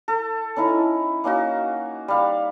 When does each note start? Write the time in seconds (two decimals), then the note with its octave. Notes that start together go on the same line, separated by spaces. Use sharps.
0.08 A4
0.56 C#4 D#4 E4 A#5
1.24 A#3 C#4 D#4 F#4
2.08 G3 F5